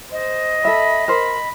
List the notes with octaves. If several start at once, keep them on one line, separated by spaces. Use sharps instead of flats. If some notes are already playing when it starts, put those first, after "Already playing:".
C5 D#5
A4 E5 B5
A#4 C5 B5